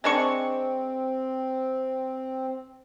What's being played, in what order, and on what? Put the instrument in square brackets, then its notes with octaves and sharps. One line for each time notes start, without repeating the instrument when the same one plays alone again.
[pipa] G#3 D4 C#6 [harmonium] C4